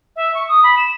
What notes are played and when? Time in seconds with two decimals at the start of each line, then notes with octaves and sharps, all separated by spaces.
0.16 E5
0.34 C#6
0.48 D#6
0.63 B5
0.77 E7